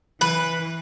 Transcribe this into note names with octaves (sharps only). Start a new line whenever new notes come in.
E3 B4